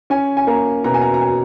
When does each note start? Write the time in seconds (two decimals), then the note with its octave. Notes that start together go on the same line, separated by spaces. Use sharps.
0.10 C#4 G#5
0.37 G#5
0.47 A#3 A#5
0.84 B2 A#5
0.94 G#5
1.02 A#5
1.14 A#5
1.21 G#5